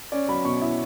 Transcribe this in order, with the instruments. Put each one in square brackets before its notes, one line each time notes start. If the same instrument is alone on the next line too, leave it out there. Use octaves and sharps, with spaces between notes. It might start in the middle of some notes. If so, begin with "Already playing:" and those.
[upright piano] C#4 D5
F#3 B5
B2 C#6
E4